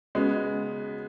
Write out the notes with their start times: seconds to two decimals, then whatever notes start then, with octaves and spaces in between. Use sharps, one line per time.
0.15 C#3 G#3 B3 F#4